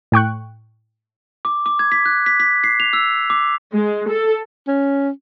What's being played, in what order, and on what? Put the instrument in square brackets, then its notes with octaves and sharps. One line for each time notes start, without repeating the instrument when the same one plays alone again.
[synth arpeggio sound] A2 G5 C#6 F#6
[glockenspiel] D6
D6
G#6
B6
F#6
B6
B6
C7
F7
E6
D6
[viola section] G#3
A4
[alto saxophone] C#4